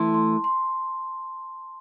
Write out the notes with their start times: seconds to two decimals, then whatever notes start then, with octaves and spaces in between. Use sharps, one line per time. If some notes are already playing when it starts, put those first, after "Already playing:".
Already playing: E3 A3 A5 C6
0.14 C6
0.44 C6